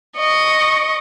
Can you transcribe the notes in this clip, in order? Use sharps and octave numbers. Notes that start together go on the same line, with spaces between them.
D#5 C#6